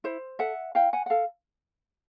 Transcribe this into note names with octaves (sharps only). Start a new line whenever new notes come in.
E4 C5
A4 E5 F#5
E4 F5 G5
F#5 G#5
F#5
A4 F5